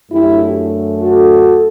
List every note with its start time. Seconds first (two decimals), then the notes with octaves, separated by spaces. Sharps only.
0.11 F#2 D3 A3 D4 E4 G4
1.01 F#4 A4